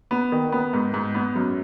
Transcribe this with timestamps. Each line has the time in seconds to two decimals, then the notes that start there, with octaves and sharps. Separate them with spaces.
0.11 B3
0.32 D#3
0.52 B3
0.73 G#2
0.94 G#2
1.15 B3
1.36 F#2